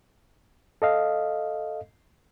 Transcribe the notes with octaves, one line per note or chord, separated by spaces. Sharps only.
A4 D#5 F5